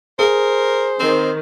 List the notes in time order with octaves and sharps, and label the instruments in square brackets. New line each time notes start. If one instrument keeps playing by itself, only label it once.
[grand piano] G#4 [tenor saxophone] A#4 [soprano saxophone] C5
[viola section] D#3 [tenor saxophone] C4